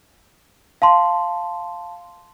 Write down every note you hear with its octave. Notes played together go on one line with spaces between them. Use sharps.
F5 A5 C6